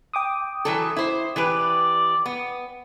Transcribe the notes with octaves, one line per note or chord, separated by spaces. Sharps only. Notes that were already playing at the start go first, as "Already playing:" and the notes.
G5 D6 D#6
E3 F#3 A4
E4 C5
E3 G4 B4 D5
B3